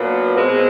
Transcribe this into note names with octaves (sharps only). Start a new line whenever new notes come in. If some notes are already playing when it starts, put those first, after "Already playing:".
Already playing: A#2 F#3 B3 D4
B2 G#3 C4